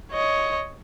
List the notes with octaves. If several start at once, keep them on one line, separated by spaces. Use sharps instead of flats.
C#5 D#5